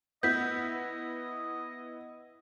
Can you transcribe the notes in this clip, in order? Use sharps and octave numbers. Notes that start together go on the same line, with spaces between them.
B3 E4 D#5 G6 B6